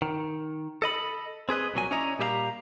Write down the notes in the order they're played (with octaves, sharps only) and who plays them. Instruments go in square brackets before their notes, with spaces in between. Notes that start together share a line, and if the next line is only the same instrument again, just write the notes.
[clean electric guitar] D#3
A4 D#5 B5
C4 G#4 B4 D#5
C2 A#2 F#3 G#5
C#4 D4 E4 C#5 D#5 A#5
A#2 G3 G4 E5 F5 A#5